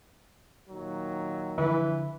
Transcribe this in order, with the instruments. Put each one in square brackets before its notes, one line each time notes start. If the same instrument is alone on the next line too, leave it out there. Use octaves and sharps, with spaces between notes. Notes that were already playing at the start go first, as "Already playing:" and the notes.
[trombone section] A#2 D#3 F#3
[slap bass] D3 F3 [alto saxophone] E3